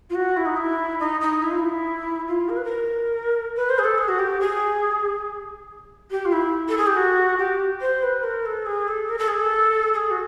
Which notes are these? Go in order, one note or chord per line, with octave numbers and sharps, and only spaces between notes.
F4
F#4
E4
D#4
E4
D#4
D#4
E4
F4
E4
F4
A#4
B4
A#4
B4
C5
G#4
A4
G#4
F#4
G4
G#4
G4
F4
E4
A4
G#4
G4
F#4
G4
C5
B4
A#4
A4
G#4
A4
A#4
A4
G#4
A4
G#4
F#4